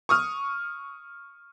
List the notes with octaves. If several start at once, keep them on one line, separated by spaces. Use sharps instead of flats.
C#6 D#6 F6